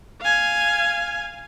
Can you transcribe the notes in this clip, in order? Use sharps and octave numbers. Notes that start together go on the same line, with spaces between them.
F5 G#5